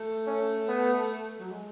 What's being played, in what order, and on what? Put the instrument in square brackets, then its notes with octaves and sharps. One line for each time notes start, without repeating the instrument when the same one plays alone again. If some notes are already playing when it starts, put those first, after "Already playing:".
Already playing: [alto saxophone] A3
[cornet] C#4
B3
[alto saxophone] F#3
G#3